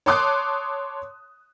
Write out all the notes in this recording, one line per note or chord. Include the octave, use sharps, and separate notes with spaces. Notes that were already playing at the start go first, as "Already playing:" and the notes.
C#5 A5 C6 D6 D#6 F#6